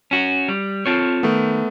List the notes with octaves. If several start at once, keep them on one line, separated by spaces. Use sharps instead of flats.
C#4 F#4
G3
C4 F4 A4 C#5
D#3 A3 B3